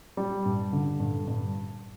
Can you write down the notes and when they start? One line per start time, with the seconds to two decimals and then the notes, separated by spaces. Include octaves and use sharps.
0.17 G3
0.46 G2
0.73 D3
1.00 G2
1.27 G2